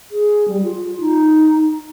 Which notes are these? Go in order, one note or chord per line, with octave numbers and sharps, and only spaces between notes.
G#4
G3
F4
D#4